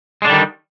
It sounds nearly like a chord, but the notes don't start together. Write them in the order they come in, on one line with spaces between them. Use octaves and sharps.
G#3 D4 D3 G3 D#3